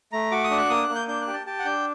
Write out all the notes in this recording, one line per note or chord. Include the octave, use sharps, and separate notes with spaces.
A3 A#5
F#4 D6
D#6
D4
F#6
A#3 D#6
F#6
A#3
G6
D4 G6
F#6
G4
A5
G4 A5
F#5
D4 G5